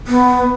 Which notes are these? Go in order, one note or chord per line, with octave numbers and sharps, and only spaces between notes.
B3